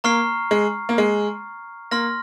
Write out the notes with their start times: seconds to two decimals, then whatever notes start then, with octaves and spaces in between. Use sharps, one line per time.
0.04 A#3 A#5 C#6 F6 C7
0.51 G#3
0.89 A#3
0.98 G#3
1.91 A#3 C6 F6 A#6